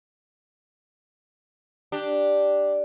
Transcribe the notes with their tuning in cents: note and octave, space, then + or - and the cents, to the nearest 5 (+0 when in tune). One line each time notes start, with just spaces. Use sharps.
D4 +0 G4 +0